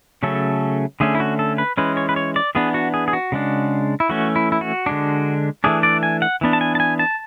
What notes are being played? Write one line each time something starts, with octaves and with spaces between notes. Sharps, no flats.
C#3 F#3 A3 C#4 A4
D3 A3 C#4 G#4
E4
F#4
A4
B4
E3 G#3 C#4 B4
C#5
B4
C#5
D5
E3 B3 D4 G#4
F#4
G#4
G#4
F#4
C#3 G#3 D4
E4
E3 A3 C#4 F#4
E4
E4
F#4
D3 G#3 D4
E3 A3 D4 G#4
D5
G#5
F#5
E3 B3 D4
A5
G#5
A5
G#5
A5